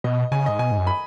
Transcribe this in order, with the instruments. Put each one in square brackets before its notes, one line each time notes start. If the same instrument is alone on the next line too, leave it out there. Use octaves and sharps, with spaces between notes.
[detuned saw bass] B2 [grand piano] D#5
[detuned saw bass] C#3 [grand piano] G#5
[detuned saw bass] G#2 [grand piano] D#5
[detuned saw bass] B2 [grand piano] G#5
[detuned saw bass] G#2
F#2
[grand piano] B5